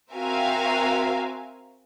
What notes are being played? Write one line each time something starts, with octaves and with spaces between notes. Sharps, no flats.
C4 F#4 A#4 E5 F5 G#5